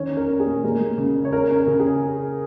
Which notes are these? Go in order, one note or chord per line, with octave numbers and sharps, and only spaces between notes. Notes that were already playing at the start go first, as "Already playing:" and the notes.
Already playing: D#3 C#4 C#5
C#4
A#4
C#4
G#4
A#2
G#3 A#4
G#3
C#3
C#4
C#5
C#4 A#4
C#4
A#4
C#3
G#4